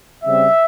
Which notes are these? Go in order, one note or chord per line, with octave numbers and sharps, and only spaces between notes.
C#3 G3 C4 E5